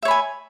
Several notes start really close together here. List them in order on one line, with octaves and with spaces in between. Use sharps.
E5 C#5 B5 G#5